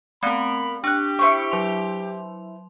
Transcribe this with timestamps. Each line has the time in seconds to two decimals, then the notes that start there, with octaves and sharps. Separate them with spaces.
0.23 A3 B3 C4 A#4 B5
0.84 D4 G4 C#6 F#6
1.19 E4 C5 C#6
1.51 F#3 C6